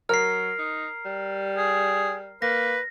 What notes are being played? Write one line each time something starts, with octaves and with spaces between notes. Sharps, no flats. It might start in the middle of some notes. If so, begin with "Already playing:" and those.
F#3 A#4 F6 C7
D#4
G3
G#4
A#3 B4 A#6